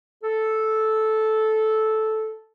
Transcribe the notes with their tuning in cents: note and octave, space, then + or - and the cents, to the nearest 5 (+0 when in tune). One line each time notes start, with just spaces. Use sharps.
A4 -10